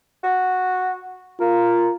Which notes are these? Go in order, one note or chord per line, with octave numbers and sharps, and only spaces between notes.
F#4
A#3 F4